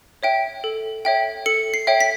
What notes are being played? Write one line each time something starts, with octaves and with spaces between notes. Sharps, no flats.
C#5 E5 G5
A4
C#5 E5 G5
A4 C#7
C7
C#5 E5 G5
B6